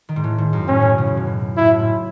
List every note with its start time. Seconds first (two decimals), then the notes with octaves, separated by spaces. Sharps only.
0.09 D#3
0.16 G#2
0.24 A2
0.38 G#2
0.53 F#2
0.68 A2 C#4
0.82 B2
0.98 C#3
1.07 B2
1.17 A2
1.27 B2
1.57 A2 E4
1.70 A2
1.79 G#2